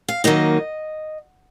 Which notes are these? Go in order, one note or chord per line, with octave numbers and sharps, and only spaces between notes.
F5
D#3 F#3 A#3 D#4 D#5